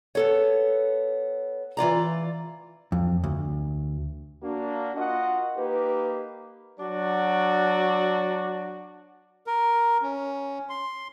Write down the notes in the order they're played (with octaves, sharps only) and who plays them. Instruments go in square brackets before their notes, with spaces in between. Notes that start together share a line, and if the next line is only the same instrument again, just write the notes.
[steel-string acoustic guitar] B3 A4 C#5
E3 F4 D5 A#5
[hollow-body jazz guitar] F2
D2
[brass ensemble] A#3 D4 F#4
F4 F#4 A#4 D#5 F#5
A#3 D#4 G4 B4
[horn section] F#3 D4 F#4 D5
[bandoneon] A#4
C#4
C6